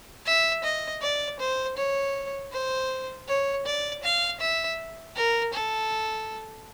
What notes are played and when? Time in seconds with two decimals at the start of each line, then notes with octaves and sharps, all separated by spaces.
0.26 E5
0.63 D#5
1.02 D5
1.39 C5
1.77 C#5
2.52 C5
3.28 C#5
3.66 D5
4.04 F5
4.40 E5
5.16 A#4
5.54 A4